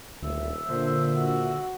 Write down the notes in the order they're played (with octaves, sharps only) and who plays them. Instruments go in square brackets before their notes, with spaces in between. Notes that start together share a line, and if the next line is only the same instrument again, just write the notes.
[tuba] D#1 [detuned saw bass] D2 [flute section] E5 E6
[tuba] A#2 [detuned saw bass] D3 [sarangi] C5
[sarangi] F#4